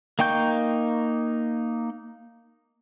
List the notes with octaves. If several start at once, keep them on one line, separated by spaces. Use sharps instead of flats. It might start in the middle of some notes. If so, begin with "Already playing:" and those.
A#3 D#4 G5 C#6 G6